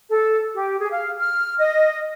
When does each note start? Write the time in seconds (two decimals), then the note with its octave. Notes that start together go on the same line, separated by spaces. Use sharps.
0.09 A4
0.55 G4
0.79 G#4
0.91 F5
1.18 F6
1.57 D#5